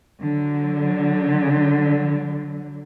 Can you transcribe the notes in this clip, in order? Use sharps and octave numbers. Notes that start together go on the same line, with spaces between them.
D3 F#3